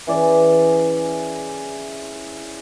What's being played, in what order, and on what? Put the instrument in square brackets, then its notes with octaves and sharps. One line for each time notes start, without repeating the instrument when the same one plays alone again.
[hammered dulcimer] E3 C#4 G#4 D5